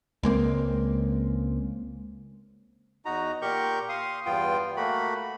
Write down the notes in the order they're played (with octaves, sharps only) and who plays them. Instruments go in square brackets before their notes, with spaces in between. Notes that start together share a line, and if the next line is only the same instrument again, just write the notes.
[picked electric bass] C#2 G#3 A#3 C4
[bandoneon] E2 D#4 F#4 A#5
A#2 G4 A#4 C#6 G6
F5 C6 D#6
E2 G2 B3 F4 G5
A3 A#3 F#4 B5